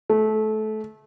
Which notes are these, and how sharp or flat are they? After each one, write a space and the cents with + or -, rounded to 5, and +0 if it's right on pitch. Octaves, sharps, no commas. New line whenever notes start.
A3 -25